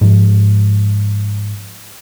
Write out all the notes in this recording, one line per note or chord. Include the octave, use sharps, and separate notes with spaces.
G#2 F3